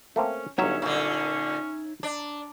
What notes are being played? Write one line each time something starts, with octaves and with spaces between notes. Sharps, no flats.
A3 A#3 C4 C#4
G1 F#3 C#4 D#4 C#5 E5
A#2 D3 C#4
D4